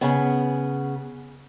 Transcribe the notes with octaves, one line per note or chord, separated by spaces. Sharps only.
C#3 B3